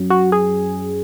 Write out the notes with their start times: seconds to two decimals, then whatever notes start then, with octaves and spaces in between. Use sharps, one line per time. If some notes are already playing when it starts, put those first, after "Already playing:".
Already playing: F#2 F#3
0.10 F#4
0.32 G#4